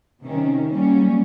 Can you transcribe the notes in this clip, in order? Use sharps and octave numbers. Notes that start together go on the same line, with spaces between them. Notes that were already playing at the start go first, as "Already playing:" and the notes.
C3 D#3 C#4
F#3 G3 A#3 C#4